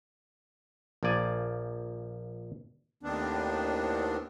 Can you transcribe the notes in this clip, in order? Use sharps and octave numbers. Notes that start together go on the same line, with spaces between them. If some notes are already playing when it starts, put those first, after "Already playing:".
A#1 F3 A#3 D5 G#5
D#2 A2 D#3 B3 C4 D4